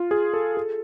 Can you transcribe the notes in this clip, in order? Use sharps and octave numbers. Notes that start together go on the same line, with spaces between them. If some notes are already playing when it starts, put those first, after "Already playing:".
Already playing: F4
G#4
A4
A4